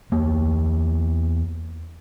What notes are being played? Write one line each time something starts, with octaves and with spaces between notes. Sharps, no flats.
E2 A#3